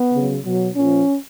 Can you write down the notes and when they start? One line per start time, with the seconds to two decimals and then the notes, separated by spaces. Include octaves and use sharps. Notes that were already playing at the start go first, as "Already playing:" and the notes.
Already playing: B3
0.13 C#3 F#3
0.44 B2 F#3
0.75 A#2 F3 C#4